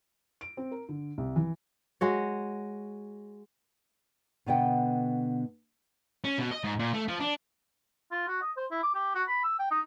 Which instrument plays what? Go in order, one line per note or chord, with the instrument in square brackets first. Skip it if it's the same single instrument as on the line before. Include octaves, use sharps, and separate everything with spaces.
[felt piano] D7
C4
A#4
D3
C2
E3
[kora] G#3 F#4 C#5
[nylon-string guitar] B2 D3 B3 D#5 F#5 G5
[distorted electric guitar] C#4
B2
D#5
G#2
A#2
A3
F3
D4
[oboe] F4
F#4
D#5
C5
E4
D6
G4
F#4
B5
E6
G5
D#4